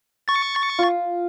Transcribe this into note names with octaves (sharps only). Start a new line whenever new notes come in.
C#6 A6
F4